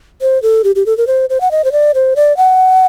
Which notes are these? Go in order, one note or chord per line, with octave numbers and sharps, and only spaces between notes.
C5
A4
G4
G4
A4
A#4
C5
C5
F#5
D#5
C5
D5
C5
D5
F#5